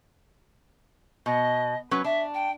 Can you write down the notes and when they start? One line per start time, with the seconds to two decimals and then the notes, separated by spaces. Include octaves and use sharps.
1.26 B2 D#5
1.91 F#3 C#4 B4
2.04 D4 E5
2.34 G5